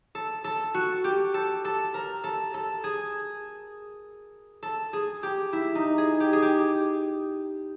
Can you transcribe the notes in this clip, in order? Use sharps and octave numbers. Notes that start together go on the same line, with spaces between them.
A4
A4
F#4
G4
A4
A4
A#4
A4
A4
G#4
A4
G#4
G4
E4
D#4
G#4
G4
G#4
G4